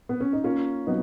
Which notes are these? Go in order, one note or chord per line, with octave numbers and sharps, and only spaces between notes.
B3
C#4
D#4
A#3 C#4 F4
F#3 B3 D#4